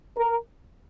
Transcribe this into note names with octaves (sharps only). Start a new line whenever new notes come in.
A#4